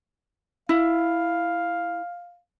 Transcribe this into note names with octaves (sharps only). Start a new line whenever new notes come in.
E4 F5